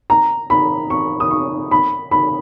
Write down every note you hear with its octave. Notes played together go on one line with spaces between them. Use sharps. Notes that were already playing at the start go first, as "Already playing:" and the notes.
A#5
B5
C#6
D#6
C#6
B5
B5